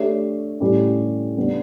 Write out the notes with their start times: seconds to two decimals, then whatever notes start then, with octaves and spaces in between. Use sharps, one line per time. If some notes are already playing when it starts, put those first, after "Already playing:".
Already playing: A3 D4 G4 C#5 E5
0.60 A2 G3 C#4 G4
1.37 G3 B3 D4